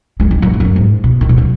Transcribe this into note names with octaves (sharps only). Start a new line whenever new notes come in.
G#3
D#3
F#2
F#2
E2
F#2
G#2
B2
D#3
B2
F#3